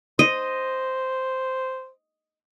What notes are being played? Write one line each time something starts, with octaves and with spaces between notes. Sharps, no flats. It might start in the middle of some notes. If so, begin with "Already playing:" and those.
C5 D#5